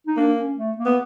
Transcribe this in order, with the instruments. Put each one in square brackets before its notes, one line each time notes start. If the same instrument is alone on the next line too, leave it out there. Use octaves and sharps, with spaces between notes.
[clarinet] D#4
[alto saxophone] A#3 [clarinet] D4
[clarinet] C#4
A3
A#3
[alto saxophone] B3